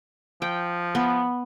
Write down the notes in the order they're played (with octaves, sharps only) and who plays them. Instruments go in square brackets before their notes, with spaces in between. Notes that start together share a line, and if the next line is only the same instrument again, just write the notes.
[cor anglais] F3 [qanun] G5
[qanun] B3